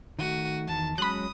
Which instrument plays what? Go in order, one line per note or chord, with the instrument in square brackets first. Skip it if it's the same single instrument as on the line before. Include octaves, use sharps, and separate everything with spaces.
[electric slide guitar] D#3 A3 [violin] F#4 D#7
[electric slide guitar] E2 D#3 [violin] A5
[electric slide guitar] F#3 G#3 C#4 [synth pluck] B5 F#6 [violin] D#6